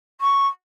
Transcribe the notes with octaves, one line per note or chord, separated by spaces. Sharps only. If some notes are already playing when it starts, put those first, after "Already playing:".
C#6